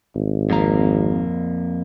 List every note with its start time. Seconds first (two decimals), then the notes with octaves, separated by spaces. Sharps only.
0.15 G#1
0.50 F2 A#3 A#5